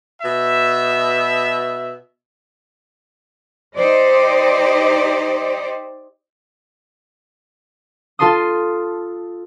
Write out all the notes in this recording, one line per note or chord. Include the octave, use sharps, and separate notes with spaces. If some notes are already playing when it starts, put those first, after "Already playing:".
B2 E5
D#4 G4 C5 D5 D#5
F4 A4 A5 C6 D#6